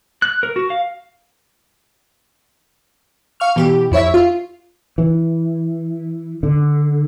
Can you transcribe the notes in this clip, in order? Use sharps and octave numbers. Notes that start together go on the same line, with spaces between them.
F#6
A#4
F#4
F5
F5 C#6 F6
B2 E3 G4
F2 E4 C#5 E5
F4
E3
D3